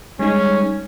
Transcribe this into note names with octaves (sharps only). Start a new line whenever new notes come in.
G3 G#3 C#4 D#4